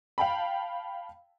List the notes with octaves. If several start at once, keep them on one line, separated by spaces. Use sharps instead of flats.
F5 G5 A5 B5